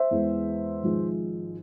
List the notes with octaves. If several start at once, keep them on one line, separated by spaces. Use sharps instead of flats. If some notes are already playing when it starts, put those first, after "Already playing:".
Already playing: C5 E5
E2 E3 G#3
G#1 G#2 F3 G#3